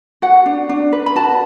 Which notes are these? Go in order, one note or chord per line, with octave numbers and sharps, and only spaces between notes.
F#4 F#5
D4
D4
B4
B5
F#4 A5